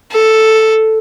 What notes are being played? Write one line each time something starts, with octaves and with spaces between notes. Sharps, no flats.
A4